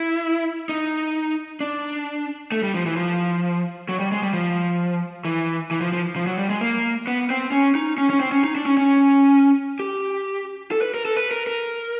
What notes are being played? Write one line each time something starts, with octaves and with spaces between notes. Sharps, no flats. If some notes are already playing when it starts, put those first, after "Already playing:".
Already playing: E4
D#4
D4
A3
G3
F3
E3
F3
F#3
G3
G#3
G3
F3
E3
E3
F3
F3
F3
F#3
G3
G#3
A#3
B3
C4
C#4
D#4
C#4
C#4
C4
C#4
D#4
D4
C#4
C#4
G4
A4
B4
A#4
A4
B4
A#4
A#4